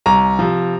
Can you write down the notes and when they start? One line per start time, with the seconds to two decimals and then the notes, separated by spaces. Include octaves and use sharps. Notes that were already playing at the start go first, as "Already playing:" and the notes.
0.06 C2 A#5
0.39 C3 F3